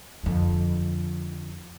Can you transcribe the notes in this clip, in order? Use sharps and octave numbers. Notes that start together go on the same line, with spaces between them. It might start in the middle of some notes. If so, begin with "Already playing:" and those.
F2 D3